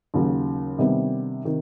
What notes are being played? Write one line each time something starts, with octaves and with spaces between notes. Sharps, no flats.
D#2 C#3 F#3
C3 D#3 G3 B3 D4
C3 D#3